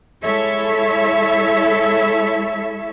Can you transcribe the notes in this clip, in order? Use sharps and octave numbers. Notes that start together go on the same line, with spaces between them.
G#3 E4 A4 C#5 E5